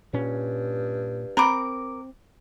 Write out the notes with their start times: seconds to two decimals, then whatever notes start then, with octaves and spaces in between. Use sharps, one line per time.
0.13 G2 A#2 C#4
1.37 C4 A#4 A#5 B5 D6